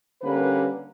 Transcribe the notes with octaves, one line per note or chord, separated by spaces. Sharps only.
D3 G3 A#3 C#4 B4